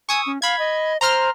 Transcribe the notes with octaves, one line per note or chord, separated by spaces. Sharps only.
G#5 C#6 D#6 E6
C#4
F5 B5 G#6
D#5
C5 A#5 C6 F6